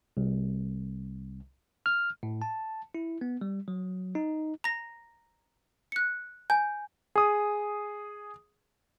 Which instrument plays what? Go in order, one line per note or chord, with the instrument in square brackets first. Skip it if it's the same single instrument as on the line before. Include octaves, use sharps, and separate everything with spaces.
[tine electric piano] C2
F6
A2
A5
E4
B3
G3
F#3
D#4
[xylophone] A#5 A#6
F#6 C#7
[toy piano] G#5 [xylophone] G6
[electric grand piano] G#4 D#6